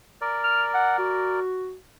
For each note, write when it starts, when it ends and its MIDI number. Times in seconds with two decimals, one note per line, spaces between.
0.21 1.40 70
0.21 1.40 74
0.44 0.63 89
0.74 0.97 78
0.99 1.76 66